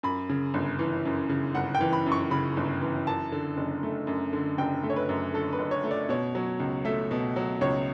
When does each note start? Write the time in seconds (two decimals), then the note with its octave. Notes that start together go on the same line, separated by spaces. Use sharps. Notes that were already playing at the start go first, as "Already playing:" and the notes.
0.03 F#2 B5
0.29 C#3
0.54 G1
0.79 E3
1.05 F#2
1.29 C#3
1.55 G1 F#5
1.75 G5
1.81 E3
1.93 B5
2.06 F#2
2.12 C#6
2.31 C#3 B5
2.57 G1
2.81 E3
3.07 F#2 A5
3.32 D3
3.57 F#1
3.83 A3
4.07 F#2
4.33 D3
4.58 F#1 G5
4.83 A3
4.90 C#5
4.96 B4
5.09 F#2
5.33 D3 A4
5.53 B4
5.59 F#1
5.71 C#5
5.84 A3
5.91 D5
6.09 B2 C#5
6.35 F#3
6.60 C#2
6.85 A3 E5
7.11 B2
7.36 F#3
7.61 C#2 C#5